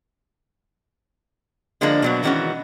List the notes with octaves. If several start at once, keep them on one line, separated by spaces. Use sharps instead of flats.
D3 F3 G#3 A#3 D4
B2 F#3 B3
D#3 E3 G#3 B3 C#4 F#4